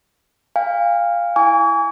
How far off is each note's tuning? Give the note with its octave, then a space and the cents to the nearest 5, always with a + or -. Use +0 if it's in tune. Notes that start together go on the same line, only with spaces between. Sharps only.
F5 +0 G#5 -45
E4 +15 G#5 -15 C#6 +45